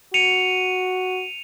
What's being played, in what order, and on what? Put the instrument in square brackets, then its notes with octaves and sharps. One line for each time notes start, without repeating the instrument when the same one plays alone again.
[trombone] F#4 [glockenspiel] C#7 [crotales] D#7 F7